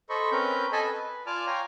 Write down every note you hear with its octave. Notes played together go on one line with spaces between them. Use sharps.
A4 C5 D#5 B5 C#6
C4 C#4 A#4 B4 G6
A4 D#5 G#5 A5 B5
B4
F4 D5 G#5 A5 D6 F6
C#5 F5 G5 G#5 A#5